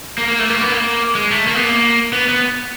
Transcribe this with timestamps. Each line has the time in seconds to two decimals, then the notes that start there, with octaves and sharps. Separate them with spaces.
0.18 A#3
0.28 A#3
0.39 A3
0.50 A#3
0.61 B3
0.72 A#3
1.15 G#3
1.31 A3
1.47 A#3
1.55 B3
1.63 A#3
2.13 B3
2.29 B3